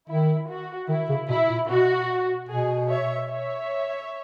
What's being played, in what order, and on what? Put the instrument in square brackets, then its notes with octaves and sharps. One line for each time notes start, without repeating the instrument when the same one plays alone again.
[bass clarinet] D#3 [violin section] E4
[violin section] F#4
[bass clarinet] D#3 [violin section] E4
[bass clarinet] C#3
[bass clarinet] B2 [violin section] E4
[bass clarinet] A#2
[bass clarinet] B2 [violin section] F#4
[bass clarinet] B2 [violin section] G#4
[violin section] C#5 E5
C#5 E5